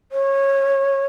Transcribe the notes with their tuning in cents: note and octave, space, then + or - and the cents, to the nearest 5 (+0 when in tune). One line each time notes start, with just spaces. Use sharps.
C#5 -20